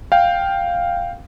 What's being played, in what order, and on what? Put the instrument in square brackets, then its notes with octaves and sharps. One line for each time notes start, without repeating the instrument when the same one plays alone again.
[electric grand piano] F5 G5